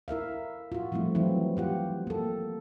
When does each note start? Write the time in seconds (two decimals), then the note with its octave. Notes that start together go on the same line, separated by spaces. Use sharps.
0.08 E4 A#4 E5 F5
0.72 F4 F#4
0.92 F3 G3 A3 C4 E4
1.15 E3 F#3 C4 E4
1.57 F4 G4 F#5
2.07 A#3 A4